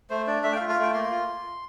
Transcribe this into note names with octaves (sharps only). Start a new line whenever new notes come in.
A3 C5
D4 D5
A3 E5
G5
F5
F4
F5
A3 G5
A#3 C6
F4